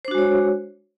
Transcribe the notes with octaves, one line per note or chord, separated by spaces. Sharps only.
G#3 D4 F#4 C5 C#5